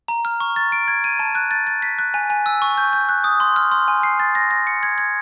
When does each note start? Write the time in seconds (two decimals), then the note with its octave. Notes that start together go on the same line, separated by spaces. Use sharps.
0.08 A#5
0.25 F6
0.40 C#6
0.56 A6
0.72 D7
0.88 G#6
1.04 D#7
1.19 A5
1.35 F#6
1.51 A6
1.67 A6
1.82 B6
1.99 F#6
2.14 G#5
2.30 G#5
2.46 E6
2.62 C#6
2.78 G6
2.93 G6
3.09 F#6
3.24 D#6
3.40 C6
3.56 F6
3.71 C6
3.88 G#5
4.03 C7
4.20 A6
4.35 A#6
4.51 A#6
4.67 C#7
4.83 G#6
4.98 G#6